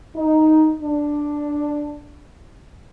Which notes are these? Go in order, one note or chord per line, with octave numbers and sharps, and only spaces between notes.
D#4
D4